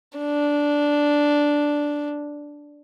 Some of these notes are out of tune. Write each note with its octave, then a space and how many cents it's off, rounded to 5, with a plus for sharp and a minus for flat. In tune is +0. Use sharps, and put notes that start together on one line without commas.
D4 -5